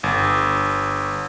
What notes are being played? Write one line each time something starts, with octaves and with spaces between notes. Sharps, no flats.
G1